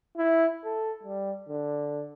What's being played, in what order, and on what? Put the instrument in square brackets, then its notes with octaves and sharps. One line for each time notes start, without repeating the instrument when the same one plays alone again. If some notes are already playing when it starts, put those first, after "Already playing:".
[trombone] E4
A4
G3
D3